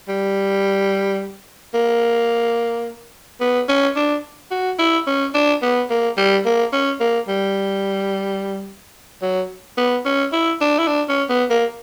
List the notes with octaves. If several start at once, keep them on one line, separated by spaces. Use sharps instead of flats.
G3
A#3
B3
C#4
D4
F#4
E4
C#4
D4
B3
A#3
G3
A#3
C#4
A#3
G3
F#3
B3
C#4
E4
D4
E4
D4
C#4
B3
A#3